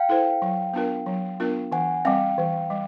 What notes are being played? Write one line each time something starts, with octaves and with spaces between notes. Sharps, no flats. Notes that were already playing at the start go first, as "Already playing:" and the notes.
Already playing: F5 G5
E4 A4 C5
F#3
B3 D4 F4 A#4
F#3
B3 D4 F4 A#4
E3 F#5 G#5
G3 C4 F5 G5
E3
G3